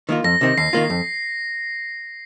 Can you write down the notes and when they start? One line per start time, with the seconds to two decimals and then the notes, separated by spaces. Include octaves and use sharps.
0.09 D#3 A#3 F4
0.24 F2 A#6
0.41 C3 D#3 C4
0.58 D#2 C7
0.73 D#3 A#3 F4
0.90 F2